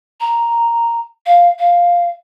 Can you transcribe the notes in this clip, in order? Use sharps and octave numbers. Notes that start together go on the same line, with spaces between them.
A#5
F5
F5